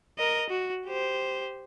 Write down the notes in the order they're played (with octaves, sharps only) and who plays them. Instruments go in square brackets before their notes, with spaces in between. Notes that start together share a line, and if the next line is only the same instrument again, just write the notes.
[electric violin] A#4 D#5
F#4
G4 C5